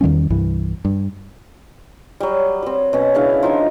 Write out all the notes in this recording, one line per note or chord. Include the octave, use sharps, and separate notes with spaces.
E2 D#3 G3 C#4
C2 G2 E3
G2
F#3 G3
F#3 C4
B2 C#4
C#3 D4 E4 F5
F3 D#4 F4